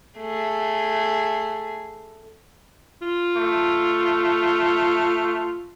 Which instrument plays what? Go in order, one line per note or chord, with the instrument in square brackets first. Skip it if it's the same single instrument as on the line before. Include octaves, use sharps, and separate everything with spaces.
[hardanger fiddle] A3 G#4
[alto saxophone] F4
[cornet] A3